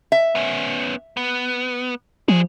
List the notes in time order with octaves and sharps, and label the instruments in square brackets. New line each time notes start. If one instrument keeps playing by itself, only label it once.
[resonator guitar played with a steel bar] E5
[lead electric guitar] B3 C#4
B3
[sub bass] F3 [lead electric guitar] G3 G#4